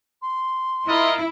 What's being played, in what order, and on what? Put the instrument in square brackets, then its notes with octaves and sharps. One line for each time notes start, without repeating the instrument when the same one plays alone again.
[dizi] C6
[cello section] E4 [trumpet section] F4 A#4 D#5